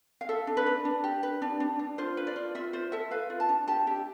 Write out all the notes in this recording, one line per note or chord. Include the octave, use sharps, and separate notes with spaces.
F5
A4 E5
D4
B4
D4
D4
G4
B4
D4
D4
D4
F4 C5
B4
D5
F4
F4 E5
F4 C5
A4 E5
B4 F5
F4
A5
D4
G4 A5
G4 E5